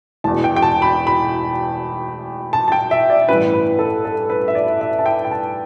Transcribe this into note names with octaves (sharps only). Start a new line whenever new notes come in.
E1 E2 B2 A5
G5
G5
A5
B5
B5
A5
A5
G5
E5
D5
A1 G2 E3 B4
B4
A4
A4
B4
E5
D5
E5
A5
G5
G5
A5